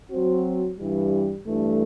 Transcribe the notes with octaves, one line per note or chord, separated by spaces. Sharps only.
F#3 C4 F#4 C5
G2 E3 G3
G2 E3 A3